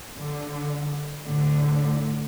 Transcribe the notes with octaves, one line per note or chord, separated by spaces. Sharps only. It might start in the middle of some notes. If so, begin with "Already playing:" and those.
D3
A2 D3